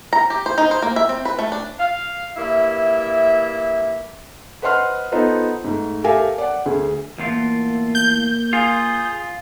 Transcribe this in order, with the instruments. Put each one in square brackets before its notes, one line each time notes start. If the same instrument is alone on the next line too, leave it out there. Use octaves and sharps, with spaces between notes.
[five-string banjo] A#5
G4
C5
D#4
C5
A#3
E5
C4
B4
A3
D4
[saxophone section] F5
G2 A#3 E4 E5
[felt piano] B4 C5 D#5 F#5 C6 F6
B3 D#4 F4 A4 B4 C5
G#2 A3
G4 A4 A#4 E5 F5 G#5
D5 F#5
D2 G#4
[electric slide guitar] E2 A2 F4 [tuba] A#3
[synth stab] G6
[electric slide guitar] F4 [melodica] G#4